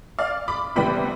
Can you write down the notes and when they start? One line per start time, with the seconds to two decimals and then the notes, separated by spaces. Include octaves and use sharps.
0.19 D5 F5
0.48 B5 D6
0.76 C3 E3 G3 B3 D4 G5 B5